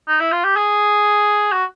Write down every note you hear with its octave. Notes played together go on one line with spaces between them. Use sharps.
D#4
E4
F4
G4
G#4
F#4